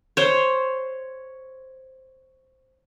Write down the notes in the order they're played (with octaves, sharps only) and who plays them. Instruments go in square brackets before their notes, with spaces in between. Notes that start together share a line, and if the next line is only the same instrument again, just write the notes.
[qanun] C5 C#5